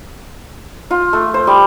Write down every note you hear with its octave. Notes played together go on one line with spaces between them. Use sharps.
F4
A3
C5
G3